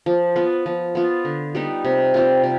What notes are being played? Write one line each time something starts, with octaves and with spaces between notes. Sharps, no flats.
F3
B3 F4 B4
F3
B3 F4
D3
G3 B3 D#4
C3
G3 C4 F4
C3